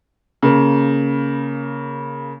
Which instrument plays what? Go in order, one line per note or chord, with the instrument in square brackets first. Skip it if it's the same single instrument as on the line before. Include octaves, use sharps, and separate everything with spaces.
[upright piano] C#3 A#3